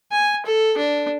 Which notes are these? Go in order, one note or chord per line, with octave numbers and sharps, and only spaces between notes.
G#5
A4
D4